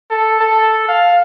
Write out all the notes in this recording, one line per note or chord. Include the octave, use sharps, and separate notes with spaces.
A4
A4
F5